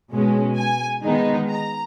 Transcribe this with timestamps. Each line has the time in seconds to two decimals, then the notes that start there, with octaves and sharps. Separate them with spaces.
0.11 B2 G#3 C#4
0.57 G#5
1.04 D#3 G#3 B3 D#4
1.50 A#5